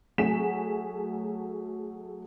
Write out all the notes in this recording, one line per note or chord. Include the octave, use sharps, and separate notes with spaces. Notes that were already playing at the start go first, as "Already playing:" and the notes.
F#3 A3 F#4 G#4 B6 E7